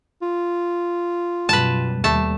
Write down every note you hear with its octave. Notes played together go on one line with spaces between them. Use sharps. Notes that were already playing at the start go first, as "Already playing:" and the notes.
F4
F#2 B2 G3 B4 A5
D#2 G3 A3 A5